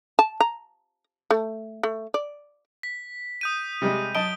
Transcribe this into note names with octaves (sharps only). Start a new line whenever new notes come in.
A5
A#5
A3
A3
D5
B6
D#6 G6 D#7
C3 G3 G#3
F#2 D#5 A5 D7 G7